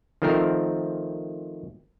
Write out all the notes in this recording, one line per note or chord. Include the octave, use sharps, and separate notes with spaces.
D#3 F3 A3 C4 A#4